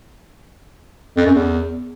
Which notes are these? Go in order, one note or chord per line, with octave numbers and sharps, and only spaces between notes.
F2
F#2
E2